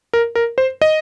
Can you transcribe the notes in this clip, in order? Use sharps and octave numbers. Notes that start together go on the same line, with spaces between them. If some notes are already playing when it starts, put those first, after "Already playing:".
A#4
A#4
C5
D#5